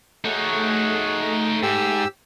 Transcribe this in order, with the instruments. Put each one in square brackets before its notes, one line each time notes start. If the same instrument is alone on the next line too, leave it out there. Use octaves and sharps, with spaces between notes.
[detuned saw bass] A3 [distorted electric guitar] D#4 C#5 [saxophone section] F#4 G#4
[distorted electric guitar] G#2 [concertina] G4 E6